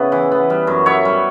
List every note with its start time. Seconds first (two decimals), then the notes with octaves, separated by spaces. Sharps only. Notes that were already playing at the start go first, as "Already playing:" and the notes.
Already playing: C#3 B3 E4 B4
0.12 E3
0.32 B3
0.50 G3
0.67 F#2
0.86 B3 C#5 E5
1.05 G3